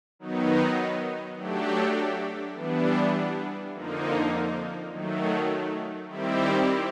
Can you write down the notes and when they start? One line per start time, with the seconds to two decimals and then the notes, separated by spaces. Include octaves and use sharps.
0.19 D#3 F#3 B3 D#4
1.36 F#3 A3 D4 G4
2.54 E3 G3 B3 D4
3.73 F2 D3 F3 A#3 D#4
4.90 D#3 F#3 A3
6.08 D#3 G3 C4 E4 G4